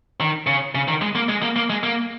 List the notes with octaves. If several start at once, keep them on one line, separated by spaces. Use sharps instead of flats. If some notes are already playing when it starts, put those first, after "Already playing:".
D#3
C#3
C#3
D#3
G#3
A#3
G#3
A#3
A#3
G#3
A#3